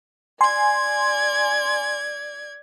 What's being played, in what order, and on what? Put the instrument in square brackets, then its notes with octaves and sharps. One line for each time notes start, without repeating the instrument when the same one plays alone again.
[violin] D5 G#6 [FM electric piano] G#5 C6